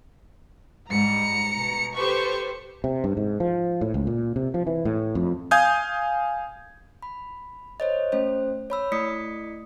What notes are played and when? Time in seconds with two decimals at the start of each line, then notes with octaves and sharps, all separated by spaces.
0.90 G#2 G3 A#5 C#7
1.58 B2
1.95 G4 A4 B4 C5 C#6
2.84 C3
3.04 G2
3.17 G#2
3.40 F3
3.81 A2
3.94 C#2
4.07 A#2
4.36 C3
4.54 F3
4.67 E3
4.85 A2
5.15 F2
5.51 F5 G#5 D#6 G6 G#6
7.02 B5
7.80 C5 C#5 D#5
8.12 A3 C#4 C5
8.70 C#5 B5 E6
8.92 A3 E4 D5 D#6 B6 C#7